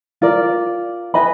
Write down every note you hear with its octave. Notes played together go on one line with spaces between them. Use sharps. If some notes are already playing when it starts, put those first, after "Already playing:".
F4 A#4 D5
B4 D#5 G#5 B5